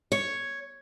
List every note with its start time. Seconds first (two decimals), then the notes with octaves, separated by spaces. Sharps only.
0.12 C#5